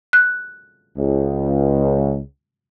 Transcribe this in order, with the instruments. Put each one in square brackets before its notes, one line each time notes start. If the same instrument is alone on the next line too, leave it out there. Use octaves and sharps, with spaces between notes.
[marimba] F#6
[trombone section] C#2